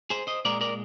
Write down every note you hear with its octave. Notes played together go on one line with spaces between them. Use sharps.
G#4 C5
C5 D#5
A#2 G#3 A#4 D5
A#4 D5